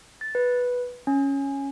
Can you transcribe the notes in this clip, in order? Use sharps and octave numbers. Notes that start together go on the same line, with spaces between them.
A6
B4
C#4